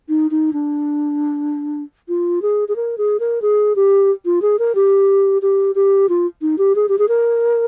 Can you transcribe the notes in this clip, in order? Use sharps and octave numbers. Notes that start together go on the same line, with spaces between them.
D#4
D#4
D4
F4
G#4
G#4
A#4
G#4
A#4
G#4
G4
F4
G#4
A#4
G4
G4
G4
F4
D#4
G4
G#4
G4
G#4
A#4